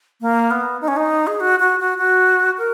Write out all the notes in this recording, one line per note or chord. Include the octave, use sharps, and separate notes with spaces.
A#3
B3
D#4
C#4
D#4
G#4
F#4
F#4
F#4
F#4
A#4